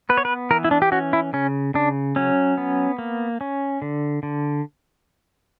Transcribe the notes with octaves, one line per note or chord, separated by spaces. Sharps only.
B3 B4
C#5
B4
E3 A#4
E4
D4
G4
C#4 F#4
E4
C#3 C#4
C#3 D4
F#3 C#4
B3
A#3
C#4
D3
D3